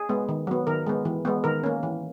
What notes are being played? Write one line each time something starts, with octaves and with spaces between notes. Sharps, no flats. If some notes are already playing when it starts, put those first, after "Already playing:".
Already playing: G#4
G#3 B3
D#3
F#3 B3
D#3 A#4
G#3 B3
E3
G#3 B3
D#3 A#4
A#3 C#4
E3